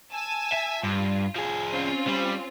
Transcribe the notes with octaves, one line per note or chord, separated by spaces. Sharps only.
G#5 A5 E6
E5
G2 F4
F3 G#4
C4 C#4 F4
G3